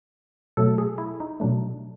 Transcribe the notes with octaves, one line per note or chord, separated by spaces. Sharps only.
B2 F#3 A3 A4
G#4
E4
D#4
B2 F#3 A3 D4